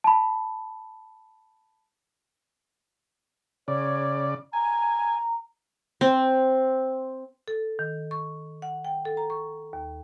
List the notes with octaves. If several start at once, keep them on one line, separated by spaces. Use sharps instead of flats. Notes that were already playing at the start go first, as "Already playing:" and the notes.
A5 B5
C#3 C#5 D5
G#5 A#5
C4
A4
D#3
C#6
F#5
G5
A4
A#5
C#6
D#2